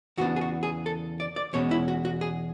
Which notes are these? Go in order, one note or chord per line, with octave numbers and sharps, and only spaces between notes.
E2 C#3 E3 B3 D4 F#4
G#4
F#4
G#4
A4
D5
D5
E2 B2 G#3 C#4 C#5
E4
F#4
F#4
G#4